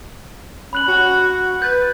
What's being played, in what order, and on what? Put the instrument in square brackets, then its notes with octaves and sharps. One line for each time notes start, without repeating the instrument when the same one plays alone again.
[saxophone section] C#4 [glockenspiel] B5 F#6 F#7
[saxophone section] F#4
[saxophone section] B4 [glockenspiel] G6 A6